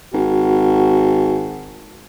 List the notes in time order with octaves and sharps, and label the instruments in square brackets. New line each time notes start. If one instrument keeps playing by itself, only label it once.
[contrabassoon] G#1 [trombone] F#4